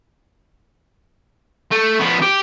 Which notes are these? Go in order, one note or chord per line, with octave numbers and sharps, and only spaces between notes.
A3
F3 B3
G4